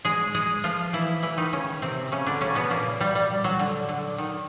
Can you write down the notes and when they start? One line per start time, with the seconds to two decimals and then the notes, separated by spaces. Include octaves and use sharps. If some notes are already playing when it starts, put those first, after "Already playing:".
0.05 G#3 G#4
0.35 G#3 G#4
0.64 F3 F4
0.93 E3 E4
1.23 E3 E4
1.37 D#3 D#4
1.53 C#3 C#4
1.82 C3 C4
2.12 C#3 C#4
2.26 D3 D4
2.41 C#3 C#4
2.55 B2 B3
2.70 A#2 A#3
3.01 G3
3.15 G3
3.44 F#3
3.59 D3
3.89 D3
4.18 D#3